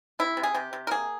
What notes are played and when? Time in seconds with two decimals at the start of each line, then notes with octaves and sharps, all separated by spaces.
0.19 C3 E4
0.37 C3
0.43 G#4
0.54 C3 G4
0.73 C3
0.87 A#4
0.91 A#3 G#4